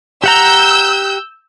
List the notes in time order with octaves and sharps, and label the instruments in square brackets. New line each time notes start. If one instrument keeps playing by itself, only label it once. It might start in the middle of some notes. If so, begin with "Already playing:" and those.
[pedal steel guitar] G4 F#5 A#5 [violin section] E6 G6